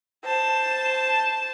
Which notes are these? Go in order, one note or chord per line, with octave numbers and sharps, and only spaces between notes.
C5 A5